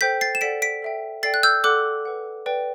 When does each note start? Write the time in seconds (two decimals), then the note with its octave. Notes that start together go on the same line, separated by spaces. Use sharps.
0.01 A4 C5 G5 G6 B6
0.21 A6 C7
0.35 E7
0.41 A4 D5 F#5 B6 D7
0.62 B6 D7
0.82 A4 E5 G5
1.23 A4 D5 G5 A6 C7
1.34 F#6
1.43 E6 G6
1.64 A4 D5 F#5 D6 F#6
2.05 B4 F#5
2.46 B4 D5 G5